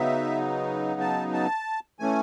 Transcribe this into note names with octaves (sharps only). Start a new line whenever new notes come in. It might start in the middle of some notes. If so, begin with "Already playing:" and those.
Already playing: C#3 F#3 B3 D#4 E5
A5
A5
E3 A3 C#4 G#5